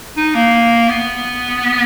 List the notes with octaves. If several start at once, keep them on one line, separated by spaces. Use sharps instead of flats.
D#4
A#3
B3